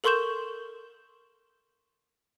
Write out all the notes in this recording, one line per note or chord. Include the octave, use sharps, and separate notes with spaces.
A4 A#4 C6 C#6 G6 E7